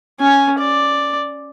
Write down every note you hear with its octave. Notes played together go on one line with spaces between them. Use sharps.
C#4 G#5
D5